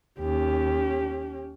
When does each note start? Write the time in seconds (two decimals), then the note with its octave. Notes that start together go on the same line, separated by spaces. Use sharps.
0.20 D#2 C#4 G4